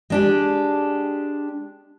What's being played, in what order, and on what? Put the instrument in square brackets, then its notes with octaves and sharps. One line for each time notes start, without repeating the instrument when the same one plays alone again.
[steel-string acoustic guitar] G#3 D4 G4